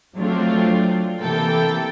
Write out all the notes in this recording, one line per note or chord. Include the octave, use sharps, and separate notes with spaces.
F3 F#3 A3 C4 D4 F4
C3 E3 A#3 A4 G5